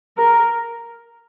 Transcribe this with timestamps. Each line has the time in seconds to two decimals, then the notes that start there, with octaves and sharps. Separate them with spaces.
0.17 A#4